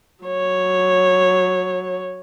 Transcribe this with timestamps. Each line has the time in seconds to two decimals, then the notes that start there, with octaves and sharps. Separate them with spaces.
0.24 F#3 C#5